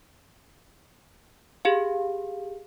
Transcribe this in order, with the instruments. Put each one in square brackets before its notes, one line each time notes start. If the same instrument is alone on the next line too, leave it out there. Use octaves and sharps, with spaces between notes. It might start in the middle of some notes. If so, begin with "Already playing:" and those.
[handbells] G4 G#4 F5